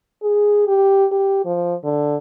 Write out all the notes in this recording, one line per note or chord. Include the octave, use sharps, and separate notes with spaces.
G#4
G4
G4
F3
D3